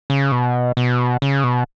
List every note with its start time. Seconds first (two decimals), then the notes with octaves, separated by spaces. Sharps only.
0.10 C#3
0.32 B2
0.77 B2
1.22 C#3
1.44 B2